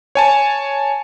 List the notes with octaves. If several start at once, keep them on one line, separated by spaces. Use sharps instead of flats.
C#5 G#5 A5